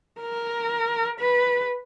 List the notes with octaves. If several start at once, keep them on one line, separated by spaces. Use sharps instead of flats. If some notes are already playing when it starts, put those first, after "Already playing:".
A#4
B4